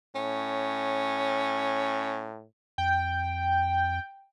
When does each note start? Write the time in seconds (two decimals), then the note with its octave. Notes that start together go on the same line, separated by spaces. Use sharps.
0.15 A2 C#4
2.78 F2 G5